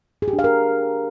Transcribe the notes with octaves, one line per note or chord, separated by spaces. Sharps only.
G#4
G4
D4
F5
A#4